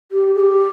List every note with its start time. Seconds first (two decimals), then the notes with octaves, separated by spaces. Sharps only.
0.12 G4
0.35 G#4
0.40 G4